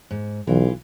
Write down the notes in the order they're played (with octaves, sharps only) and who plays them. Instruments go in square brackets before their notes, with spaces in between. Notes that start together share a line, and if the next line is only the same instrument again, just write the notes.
[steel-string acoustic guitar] G#2
[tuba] B1 [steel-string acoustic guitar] E3 F4